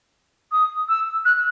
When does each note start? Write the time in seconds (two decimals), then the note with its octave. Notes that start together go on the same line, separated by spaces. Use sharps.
0.52 D#6
0.89 E6
1.25 F#6